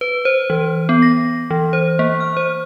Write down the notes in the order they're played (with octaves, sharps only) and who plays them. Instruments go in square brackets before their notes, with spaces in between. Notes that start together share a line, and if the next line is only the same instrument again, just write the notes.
[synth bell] B4
C5
E3
B3
A#6
E3
C5
A#3
F6
C5